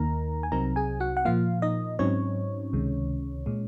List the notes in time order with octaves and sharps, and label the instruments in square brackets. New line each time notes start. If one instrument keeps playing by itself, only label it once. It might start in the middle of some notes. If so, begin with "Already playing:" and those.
Already playing: [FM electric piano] D#2 D#3 A#3 D#4 A#4 A#5
G#5
C2 C3 F#3 C4 D#4 A#4 A#5
G#4 G#5
F#4 F#5
F#5
A#2 F3 A#3 F4 F5
D#4 D#5
G#2 F#3 C4 C#4 D#4 C#5
C#2 C3 D#3 G#3
A#2 G#3